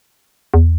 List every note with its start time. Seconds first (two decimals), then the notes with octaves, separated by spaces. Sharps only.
0.54 E2